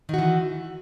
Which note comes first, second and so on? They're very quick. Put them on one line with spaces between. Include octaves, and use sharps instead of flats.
D#3 F#4 E3